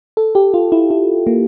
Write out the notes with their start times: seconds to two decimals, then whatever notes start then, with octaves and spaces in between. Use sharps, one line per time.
0.17 A4
0.35 G4
0.54 F4
0.72 E4
0.90 E4
1.27 A#3